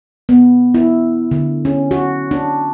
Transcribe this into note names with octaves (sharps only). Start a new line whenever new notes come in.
B3
E4
D3
C#4
F#4
D4